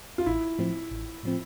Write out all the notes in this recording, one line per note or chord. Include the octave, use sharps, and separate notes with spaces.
F4
A1 E4
A2 F3 C4
A1
A2 F3 C4